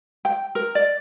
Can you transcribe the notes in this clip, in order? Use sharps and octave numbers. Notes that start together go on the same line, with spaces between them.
G5
A#4
D5